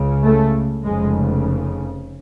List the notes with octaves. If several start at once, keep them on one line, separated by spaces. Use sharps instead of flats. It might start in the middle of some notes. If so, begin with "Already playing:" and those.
Already playing: C#2 C#3
A3
F1 F2 C#3 G#3